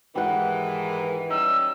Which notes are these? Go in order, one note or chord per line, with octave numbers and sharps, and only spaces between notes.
G#2 D#3 E3 G4 F#5
G3 C#4 D#4 E6